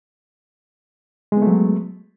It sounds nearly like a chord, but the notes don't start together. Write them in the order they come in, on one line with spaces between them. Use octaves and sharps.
G#3 B3 A3 F#3